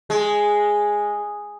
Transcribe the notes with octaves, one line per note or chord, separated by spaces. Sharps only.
G#3